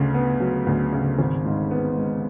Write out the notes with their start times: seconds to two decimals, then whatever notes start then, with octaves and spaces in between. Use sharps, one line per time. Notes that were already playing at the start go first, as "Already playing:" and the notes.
Already playing: D2 C#3
0.14 B3
0.40 F#3
0.67 D2
0.92 C#3
1.19 G#1
1.45 G#2
1.71 B3
1.97 G#3